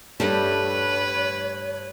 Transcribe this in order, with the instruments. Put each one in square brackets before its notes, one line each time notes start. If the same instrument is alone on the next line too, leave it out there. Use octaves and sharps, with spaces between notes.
[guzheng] G2 G3 A3 [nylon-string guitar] D4 G4 [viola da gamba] B4 [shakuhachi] C#5